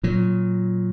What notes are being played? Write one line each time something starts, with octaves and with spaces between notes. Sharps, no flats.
A#2 F#3